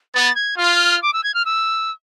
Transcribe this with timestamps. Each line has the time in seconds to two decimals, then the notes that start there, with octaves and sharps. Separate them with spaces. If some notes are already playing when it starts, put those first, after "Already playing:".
0.14 B3 A6
0.35 G#6
0.57 F4 F6
1.02 D6
1.13 E6
1.24 G#6
1.34 F6
1.45 E6